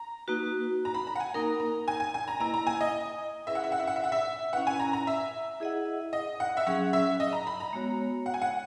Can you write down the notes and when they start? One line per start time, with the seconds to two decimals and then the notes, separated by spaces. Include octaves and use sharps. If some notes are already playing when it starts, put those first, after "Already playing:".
Already playing: A#5
0.28 A#3 D#4 F#4 B4
0.85 A#5
0.94 B5
1.07 A#5
1.15 F#5
1.20 G#5
1.34 A#3 D#4 A#4 A#5
1.60 A#5
1.88 G#5
2.00 G#5
2.14 G#5
2.28 A#5
2.40 A#3 E4 B4 D#5 A#5
2.54 A#5
2.67 G#5
2.81 D#5
3.47 C#4 E4 G#4 B4 E5
3.55 F#5
3.64 E5
3.72 F#5
3.79 E5
3.87 F#5
3.96 E5
4.04 F#5
4.12 E5
4.53 C#4 E4 B4 F#5
4.67 G#5
4.80 A#5
4.93 A#5
5.07 E5
5.60 E4 G#4 D#5 F#5
6.13 D#5
6.40 F#5
6.57 E5
6.67 F#3 C#4 G#4 F#5
6.93 E5
7.20 D#5
7.33 A#5
7.47 B5
7.60 A#5
7.73 G#3 B3 F#4 C#5
8.26 F#5
8.34 G#5
8.42 F#5